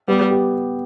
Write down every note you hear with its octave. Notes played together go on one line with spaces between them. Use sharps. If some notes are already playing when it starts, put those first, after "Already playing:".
G3 B3
G4